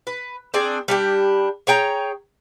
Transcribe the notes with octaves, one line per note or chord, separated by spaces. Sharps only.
B4
C4 D4 G#4 D5
G3 D4 G4
G#4 C#5 G5 A#5